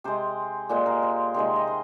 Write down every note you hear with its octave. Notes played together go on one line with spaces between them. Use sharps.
C3 G#3 C5
A#2 G#3 C5
A#4
C5
C3 D#3 G#3 C5
D#5
C5